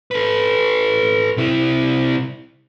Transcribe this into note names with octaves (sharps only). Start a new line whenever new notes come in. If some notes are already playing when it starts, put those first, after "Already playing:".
A4 B4
C3 E4